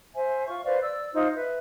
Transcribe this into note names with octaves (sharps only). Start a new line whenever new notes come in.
C5 E5 G#5
F4 C#6
B4 C5 D5 F5
D5 E6
D#4 F4 C5
B4 E5